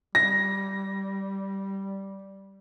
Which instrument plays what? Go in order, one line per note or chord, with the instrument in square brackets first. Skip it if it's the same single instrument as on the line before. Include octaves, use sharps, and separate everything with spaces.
[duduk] G3 [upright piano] A#6